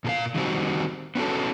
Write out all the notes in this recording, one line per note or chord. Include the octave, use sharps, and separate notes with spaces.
A#2 A4 F5
D#3 G3 C4 F#4
B3 C#4 F#4 A4